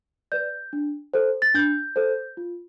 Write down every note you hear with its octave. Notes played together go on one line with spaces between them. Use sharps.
B4 D5 G6
D4
A4 C5
A6
D4 G6
A4 C5
F4